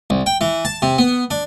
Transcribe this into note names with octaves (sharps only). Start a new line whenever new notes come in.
C2
G5
E3
A5
C3
B3
D4